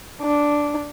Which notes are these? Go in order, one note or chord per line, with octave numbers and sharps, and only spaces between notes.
D4